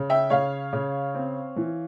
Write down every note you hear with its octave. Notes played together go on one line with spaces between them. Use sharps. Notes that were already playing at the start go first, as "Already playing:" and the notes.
Already playing: C#3
E5 G5
C#3 C#5 F5
C#3
C4
E3